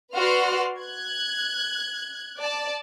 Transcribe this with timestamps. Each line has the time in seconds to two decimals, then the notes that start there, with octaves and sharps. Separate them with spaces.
0.15 F#4 B4 D5 C6 F6
0.80 F#6 G#6
2.40 D5 A5